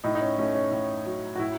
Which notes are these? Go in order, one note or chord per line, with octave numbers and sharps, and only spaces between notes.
A2 D#4
D#4
C#4
A3 C#4
C#4
A2
F#3
F#4
A2 E4